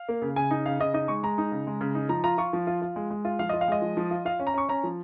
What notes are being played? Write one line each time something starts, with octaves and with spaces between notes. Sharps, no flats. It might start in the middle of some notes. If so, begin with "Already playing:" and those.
Already playing: F5
A#3
C#3
C#3 G#5
D#4
C#3 F5
C#3 D#5
D#4 D#5
G#3 C#6
G#3 A#5
D#4
C#3
G#3
C#3
D#4
F3 A#5
F4 A#5
F4 C#6
F3
F4
F4
G#3
G#3
F4
F3 F5
F4 D#5
F5
G#3 D#5
F3
F3
F4
F4 F5
C#4
A#5
C#4 C#6
C#4 A#5
F3